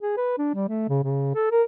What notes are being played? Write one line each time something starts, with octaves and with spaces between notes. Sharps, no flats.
G#4
B4
D4
G3
A3
C#3
C#3
A4
A#4